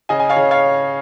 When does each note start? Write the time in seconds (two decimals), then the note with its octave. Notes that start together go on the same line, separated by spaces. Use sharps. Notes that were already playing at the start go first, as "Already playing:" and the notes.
0.09 C#3 D#5 G#5
0.20 G#5
0.29 C#5 F5
0.36 C#3
0.51 C#5 F5